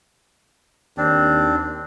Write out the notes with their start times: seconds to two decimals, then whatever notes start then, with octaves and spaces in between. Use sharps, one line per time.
0.97 D#2 C4 D4